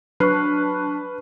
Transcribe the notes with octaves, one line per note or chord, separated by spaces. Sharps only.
F#3 D4 B4 C#6 F6 F#6 C7